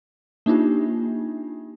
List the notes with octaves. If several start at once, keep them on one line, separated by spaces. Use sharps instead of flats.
A#3 D4 D#4 F4 G4